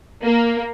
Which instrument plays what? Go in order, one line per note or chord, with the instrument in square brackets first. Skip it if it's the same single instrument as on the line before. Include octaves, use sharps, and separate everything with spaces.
[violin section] A#3